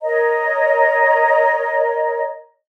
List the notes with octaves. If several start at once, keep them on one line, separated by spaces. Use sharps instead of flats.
A#4 C#5 D#5 A#5